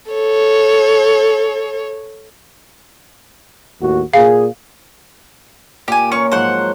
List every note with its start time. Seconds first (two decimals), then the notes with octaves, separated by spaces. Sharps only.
0.11 A4 C#5
3.80 D#2 A2 F#4
4.13 A#2 G#4 F5
5.88 A#2 G4 G#5
6.12 C#4 A#4 C#5 C#6
6.32 G#2 F3 F#3 C5 F#5